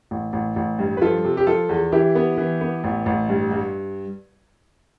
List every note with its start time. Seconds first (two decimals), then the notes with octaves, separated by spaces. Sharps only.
0.11 A1
0.33 A1
0.56 A1
0.79 G2
0.97 B4
1.02 F3 F4 A4
1.25 C3
1.37 G4
1.47 F3 F4 A4
1.69 E2
1.92 E3 E4 G4
2.15 B3
2.37 E3
2.61 B3
2.84 A1
3.06 A1
3.29 G2
3.51 G2